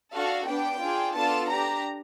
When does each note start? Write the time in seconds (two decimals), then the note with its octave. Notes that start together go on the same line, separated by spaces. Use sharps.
0.13 D4 F#4 A4 F5
0.47 B3 D4 G4 G5
0.81 D4 F4 G#4
1.15 B3 D4 F4 A4 A5
1.49 D4 G4 A#5